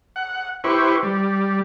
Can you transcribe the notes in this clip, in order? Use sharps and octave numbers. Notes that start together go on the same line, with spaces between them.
F#5
E4 G4 B4 C5 C#6
G3